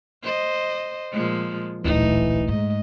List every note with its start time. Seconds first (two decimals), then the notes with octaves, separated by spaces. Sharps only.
0.23 C5 D#5
1.11 A#2 F3 G#3
1.84 D1 A#1 E3 A3 D#4
2.48 G#2 D#5